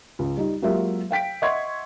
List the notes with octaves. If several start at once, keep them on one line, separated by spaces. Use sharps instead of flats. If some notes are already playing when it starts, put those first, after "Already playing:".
C#2
G3 D#4
F#3 G#3 A#3 F4 G4 E5
F5 G5 B6 D7
D#5 E5 F#5 C6 C#6 G#6